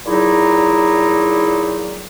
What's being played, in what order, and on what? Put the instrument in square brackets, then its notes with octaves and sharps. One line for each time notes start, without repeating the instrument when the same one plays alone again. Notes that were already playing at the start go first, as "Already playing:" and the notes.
[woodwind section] A#2 F#3 D#4 E4 G#4